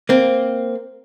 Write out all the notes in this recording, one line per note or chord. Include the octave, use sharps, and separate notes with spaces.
A#3 C4